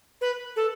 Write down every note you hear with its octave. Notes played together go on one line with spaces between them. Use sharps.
B4
A4